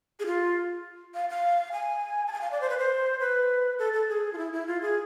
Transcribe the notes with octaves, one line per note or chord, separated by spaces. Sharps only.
G#4
F4
F5
F5
G#5
A5
G#5
F5
D5
C5
B4
C5
B4
A4
A4
G#4
F4
E4
E4
F4
G#4